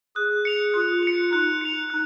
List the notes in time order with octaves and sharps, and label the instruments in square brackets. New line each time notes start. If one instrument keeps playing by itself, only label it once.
[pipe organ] G#4 [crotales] F#6
[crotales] C#7 F7
[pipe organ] F4 [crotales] F#6
[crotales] C#7 F7
[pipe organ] D#4 [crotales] F#6
[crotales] C#7 F7
F#6